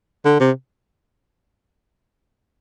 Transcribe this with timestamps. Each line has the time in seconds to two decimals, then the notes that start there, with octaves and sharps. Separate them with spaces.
0.25 D3
0.40 C3